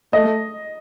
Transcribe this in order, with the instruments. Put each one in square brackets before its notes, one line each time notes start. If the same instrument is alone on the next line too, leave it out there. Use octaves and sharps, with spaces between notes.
[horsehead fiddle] A3 [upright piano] D#5